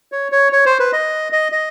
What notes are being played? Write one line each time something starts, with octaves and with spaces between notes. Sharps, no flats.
C#5
C#5
C#5
C5
B4
D#5
D#5
D#5